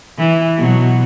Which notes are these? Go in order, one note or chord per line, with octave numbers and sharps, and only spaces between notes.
E3
B2 F#3